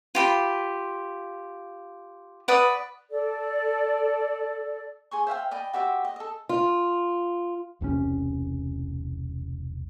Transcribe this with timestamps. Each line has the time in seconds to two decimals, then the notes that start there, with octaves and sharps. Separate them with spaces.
0.15 F4 G4 B5
2.48 B4 D5 F#5 D#6
3.10 A4 D5
5.11 G#4 C6 C#6
5.27 C5 E5 F5 G5
5.51 D5 D#5 G5 B5
5.73 F#4 G4 C5 E5
6.05 D#5
6.16 A4 D#5
6.49 F4
7.81 E1 C2 C3 C#4